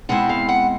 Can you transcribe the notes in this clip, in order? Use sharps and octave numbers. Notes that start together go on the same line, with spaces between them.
B2 G#3 C4 E4 F#5
F5
F#5